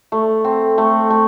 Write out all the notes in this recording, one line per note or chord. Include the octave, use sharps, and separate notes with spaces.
A3
C4
A3
A3